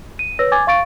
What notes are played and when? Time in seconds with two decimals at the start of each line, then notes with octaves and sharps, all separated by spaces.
0.19 D#7
0.39 B4 C#5 E6 A#6
0.52 G#5 D6 G#6 A6
0.67 F5 C#6 A6 D7